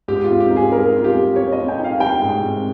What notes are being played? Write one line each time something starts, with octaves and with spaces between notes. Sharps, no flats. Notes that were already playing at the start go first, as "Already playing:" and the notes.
G#2 G4
F4
C4
G4
D#4
G#4
G3 A#4
C4 F4
G4
G3
C4 C#5
D#5
C4
G5
D#4
F5
G3 G5
G#2
C4